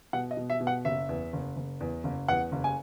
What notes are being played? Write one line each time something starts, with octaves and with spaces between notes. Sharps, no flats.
B2 F#5
D#5
B2
E5
B2
F#5
F#1 E5
E2
F#1
F#1
E2
F#1
E2 F#5
F#1
G#5